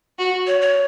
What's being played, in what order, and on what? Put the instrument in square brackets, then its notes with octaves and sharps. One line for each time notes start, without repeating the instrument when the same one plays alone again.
[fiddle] F#4
[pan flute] C#5
C#5